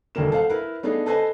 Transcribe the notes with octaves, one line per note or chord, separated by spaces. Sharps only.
E1 D#2 G3 A3 A#3 E7
A4 C5 F5 F#5
E4 A#4 B4
A3 B3 D4 D#4 G#4
A4 B4 C5 D#5 G#5 A5